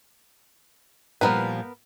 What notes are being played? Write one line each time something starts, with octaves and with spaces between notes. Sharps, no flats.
A#2 F3 G3 B3 A#4 B4